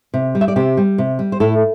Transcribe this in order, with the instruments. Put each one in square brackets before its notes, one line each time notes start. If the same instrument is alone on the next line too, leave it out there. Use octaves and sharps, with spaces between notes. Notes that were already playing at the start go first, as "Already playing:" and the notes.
[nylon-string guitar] C3
G3
E5
D5
C3 G4 C5
G3
C3
G3
C5
A2 E4 A4